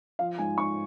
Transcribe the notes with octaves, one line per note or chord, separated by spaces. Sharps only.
F3 F5
G#2 G#5
G#2 C#6